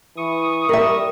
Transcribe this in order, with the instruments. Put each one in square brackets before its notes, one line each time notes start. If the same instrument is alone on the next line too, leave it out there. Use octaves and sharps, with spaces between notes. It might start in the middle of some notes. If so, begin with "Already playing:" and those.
[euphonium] E3 [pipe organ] C#6 D#6
[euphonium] G3 [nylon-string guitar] A#4 E5